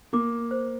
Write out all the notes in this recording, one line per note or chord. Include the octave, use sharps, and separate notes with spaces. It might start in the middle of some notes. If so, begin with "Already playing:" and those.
A#3 D6
C5